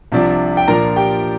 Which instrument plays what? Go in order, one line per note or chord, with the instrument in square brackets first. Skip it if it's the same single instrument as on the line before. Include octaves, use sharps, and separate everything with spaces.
[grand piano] C2 C3 F3 D4
G5
A#2 F3 D4 A#4 A#5
G4 G5